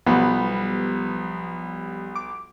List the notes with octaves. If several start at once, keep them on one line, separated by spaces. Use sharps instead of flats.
B1 F3 G3 B3
D6